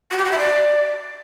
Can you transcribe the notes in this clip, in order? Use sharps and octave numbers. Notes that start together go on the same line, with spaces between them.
F#4
G4
F#4
E5
D5